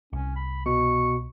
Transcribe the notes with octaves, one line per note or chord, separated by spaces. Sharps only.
C2 C#4
B5
B2 C#6